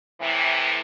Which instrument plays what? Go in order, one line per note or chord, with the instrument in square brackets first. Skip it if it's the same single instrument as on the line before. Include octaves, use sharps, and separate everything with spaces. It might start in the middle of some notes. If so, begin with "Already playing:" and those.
[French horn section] A2 C3 E3